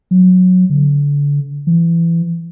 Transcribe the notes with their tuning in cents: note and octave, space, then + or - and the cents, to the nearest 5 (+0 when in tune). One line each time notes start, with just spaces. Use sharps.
F#3 -15
D3 -35
E3 +25